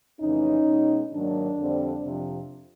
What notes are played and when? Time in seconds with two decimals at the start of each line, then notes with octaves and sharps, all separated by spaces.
0.19 F2 C#3 E3 A3 C#4 D#4
0.65 B2 G#3 B3
1.11 G#2 D#3 F#3 A#3 D4
1.57 F2 D3 G3 C4
2.03 F2 C3 F3